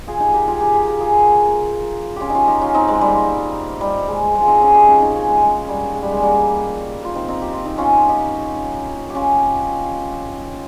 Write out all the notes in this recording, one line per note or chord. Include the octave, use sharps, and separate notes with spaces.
F4 G#4
D#4 G4
G4 A#4
F4 G#4
G4 A#4
F4 G#4
G4 A#4
F4 G#4
C#4 F4 G4
C#4 D#4 F4
D#4 G4
C#4 F4
C4 D#4
G#3 C4
G3 A#3
G3
G#3
G#3
F4
C4 D#4
C#4 F4
D#4 G4
C#4 F4
C4 D#4
A#3 C#4
G#3
G#3
G3
G#3
G3
G#3
G3 A#3
F4
C4 D#4
C4 D#4
G4
F4
D#4
C#4 F4
D#4 G4
G4
C#4 F4